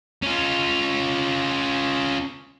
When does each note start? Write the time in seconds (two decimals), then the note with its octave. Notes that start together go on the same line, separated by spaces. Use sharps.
0.23 C#4 F4